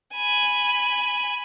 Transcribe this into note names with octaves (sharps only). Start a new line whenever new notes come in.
G#5 B5